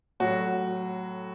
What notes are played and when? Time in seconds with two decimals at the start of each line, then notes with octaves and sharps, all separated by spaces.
0.20 A2 F#3 F#4